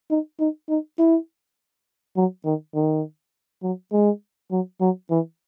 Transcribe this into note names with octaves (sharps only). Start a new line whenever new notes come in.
D#4
D#4
D#4
E4
F#3
D#3
D#3
F#3
G#3
F#3
F#3
E3